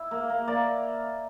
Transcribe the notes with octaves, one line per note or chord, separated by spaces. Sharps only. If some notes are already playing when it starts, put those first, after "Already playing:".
Already playing: E4
A#3
A#3
A#3 D5